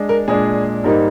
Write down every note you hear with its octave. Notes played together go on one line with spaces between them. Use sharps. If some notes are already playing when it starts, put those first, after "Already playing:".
Already playing: G#3 D4
A#4
A#2 G#3 D4 G#4
G#2 G3 A#3 D#4